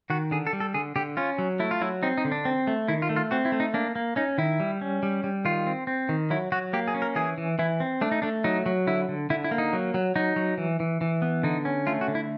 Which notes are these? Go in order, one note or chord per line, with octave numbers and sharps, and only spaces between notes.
D#3 F#4
D3 G#4
A4
G3
A4
D3 G#4
D3 G4
C#4 F4
F#3
A3 E4
F4
F#3 E4
C4 D#4
D#4
D3
D4
C4
A3
D#3 E4
F4
A3
F4
C4 F#4
E4
A3
D#4
A#3 D4
A#3
C#4 D#4
D#3 E4
G3
C#4
G3
G3
D#3 F4
C4
C4
D#3
F#3 E4
F#3 F#4
A#3 G4
G#4
C#4
A#4
E3 G#4
E3
E3 E4
C4
A3 D4
D#4
A3 D4
F#3 D#4
F#3
D3 E4
D3
D3 E4
E4
A#3
D#4
F#3
F#3
F#3 D#4
F#3
E3
E3
E3
B3
D3 D#4
C#4
A3 F4
F#4
D3
E4